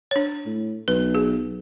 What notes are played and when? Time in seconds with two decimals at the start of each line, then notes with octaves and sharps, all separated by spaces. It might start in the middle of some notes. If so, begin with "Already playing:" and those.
0.11 D4 C#5
0.46 A2
0.88 B1 B4
1.15 G#4